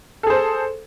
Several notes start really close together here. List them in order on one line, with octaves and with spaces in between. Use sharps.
A4 G#4 C5